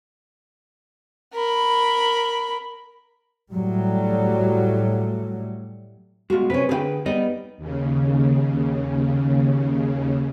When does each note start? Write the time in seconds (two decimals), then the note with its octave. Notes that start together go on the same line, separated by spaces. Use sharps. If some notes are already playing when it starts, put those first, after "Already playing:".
1.34 A#4 B5
3.53 A2 F#3 G3 A3
6.30 G2 B2 G#3 F4 F#4
6.50 C3 G#3 C#4 B4
6.69 D3 G#4 B4 F5 G5
7.06 G3 B3 D#4 D5 D#5
7.58 D#2 C#3